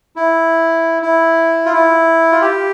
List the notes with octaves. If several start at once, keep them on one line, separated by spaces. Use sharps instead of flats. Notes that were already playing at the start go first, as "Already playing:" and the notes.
E4
E4
F4
E4
F4
G4